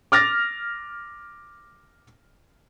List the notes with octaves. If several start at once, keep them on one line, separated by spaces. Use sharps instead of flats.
D6 F6 A6 A#6